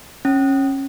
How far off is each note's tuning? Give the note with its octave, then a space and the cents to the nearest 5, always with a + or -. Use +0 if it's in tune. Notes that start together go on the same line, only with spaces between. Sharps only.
C#4 -20